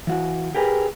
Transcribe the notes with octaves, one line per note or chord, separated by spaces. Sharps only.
E3 F#4
G4 G#4 A#4 B4